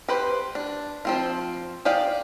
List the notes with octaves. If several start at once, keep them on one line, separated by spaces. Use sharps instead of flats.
G4 B4 C5
D4
F3 C4 F4
G4 G#4 D5 F5